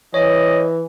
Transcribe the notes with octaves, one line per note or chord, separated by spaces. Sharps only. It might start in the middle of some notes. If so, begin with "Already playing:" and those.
E3 C#5 D#5